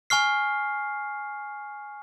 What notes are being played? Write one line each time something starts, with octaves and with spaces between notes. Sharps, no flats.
G#5 C#6 F6 C7